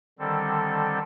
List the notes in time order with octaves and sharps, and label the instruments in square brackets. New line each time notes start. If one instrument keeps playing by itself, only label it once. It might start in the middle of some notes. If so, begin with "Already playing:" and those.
[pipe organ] D3 D#3 G3 C4 A4